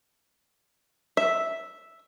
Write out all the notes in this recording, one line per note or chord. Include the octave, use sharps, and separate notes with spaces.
E5